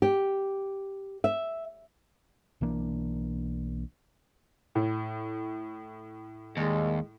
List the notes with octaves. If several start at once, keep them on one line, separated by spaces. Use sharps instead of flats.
G4
E5
B1 E3 A#3 D4
A2
D#2 D#3 G3 G#3